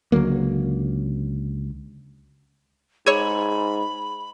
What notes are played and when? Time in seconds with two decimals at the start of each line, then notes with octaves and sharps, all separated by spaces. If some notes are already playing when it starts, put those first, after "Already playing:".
0.12 C#2 D3 F#3 A#3
3.06 G#2 G#4 C#5 B5 E6 G#6